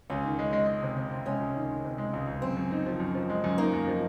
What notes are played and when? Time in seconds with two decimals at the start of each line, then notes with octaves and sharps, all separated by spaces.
0.10 C#2 C#4
0.24 D#3
0.39 G#3
0.53 G#3
0.67 G#3
0.82 C3
0.97 C3
1.11 C3
1.26 G#3 C#4
1.40 C#2
1.55 D#3
1.70 D#3
1.84 C3
1.98 G#3
2.13 C#2
2.27 C#2
2.42 F#2 C4
2.57 F#2
2.71 D#4
2.86 F3
3.00 F#2
3.15 F3
3.30 G#3
3.44 F#2
3.58 A#3 D#4
3.73 F#2
3.88 F3